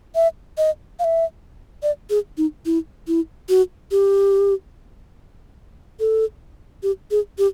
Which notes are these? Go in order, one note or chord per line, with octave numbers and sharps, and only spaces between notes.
E5
D#5
F5
E5
D5
G#4
D#4
E4
E4
F#4
G4
A4
G4
G#4
G4